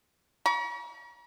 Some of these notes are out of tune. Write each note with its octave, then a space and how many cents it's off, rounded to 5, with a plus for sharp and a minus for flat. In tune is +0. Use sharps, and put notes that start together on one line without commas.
A#5 +45 C#6 +35